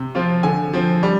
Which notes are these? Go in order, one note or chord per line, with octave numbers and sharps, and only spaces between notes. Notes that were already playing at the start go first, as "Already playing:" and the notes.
Already playing: C3
F3 C4 F4
D3 G#5
F3 C4
G3